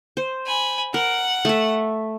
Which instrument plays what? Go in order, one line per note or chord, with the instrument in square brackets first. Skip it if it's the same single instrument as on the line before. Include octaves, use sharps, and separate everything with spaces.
[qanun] C5
[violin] G#5 B5
[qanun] A#4 [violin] F#5
[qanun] A3 E5